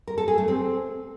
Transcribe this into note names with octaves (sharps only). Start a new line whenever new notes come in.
A#4
A4
G#4
A3
C4